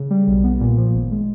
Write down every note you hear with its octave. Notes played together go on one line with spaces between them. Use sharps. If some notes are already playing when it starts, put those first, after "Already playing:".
Already playing: C#3
G3
B1
B3
A#2
F3
G#1
G#3